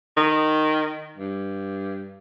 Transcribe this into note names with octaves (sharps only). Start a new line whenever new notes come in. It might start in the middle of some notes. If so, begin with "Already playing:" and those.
D#3
G2